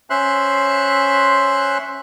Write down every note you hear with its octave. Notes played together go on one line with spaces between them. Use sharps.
C#4 C5 E5 C6 F#6